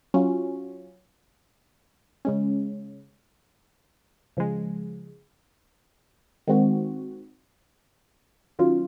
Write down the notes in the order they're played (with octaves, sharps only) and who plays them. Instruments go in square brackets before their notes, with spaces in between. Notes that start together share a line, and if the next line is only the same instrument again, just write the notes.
[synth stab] F#3 C#4 F4
C#3 G#3 C#4
C#3 F3 G#3
D#3 G#3 C4 F#4
D#3 F#3 C#4 F4